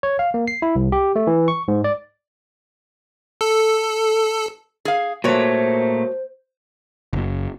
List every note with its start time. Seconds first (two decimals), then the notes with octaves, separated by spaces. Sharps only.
0.03 C#5
0.19 F5
0.34 A#3
0.48 C7
0.62 E4
0.76 C2
0.92 G4
1.16 A3
1.27 E3
1.48 C#6
1.68 G#2
1.84 D5
3.41 A4
4.85 G#4 F5
5.24 A#2 A3 F#4 C5 C#5
7.13 F#1